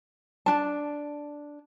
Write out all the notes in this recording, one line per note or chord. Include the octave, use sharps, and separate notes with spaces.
D4 A5